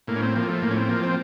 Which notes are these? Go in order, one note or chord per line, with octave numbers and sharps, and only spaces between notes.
A2 A#3
C#4
C4
F3 A#3
A3
A2 A#3
C#4
C4
F3 A#3
C4